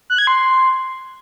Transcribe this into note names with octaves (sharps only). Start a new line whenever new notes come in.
F#6
G#6
C6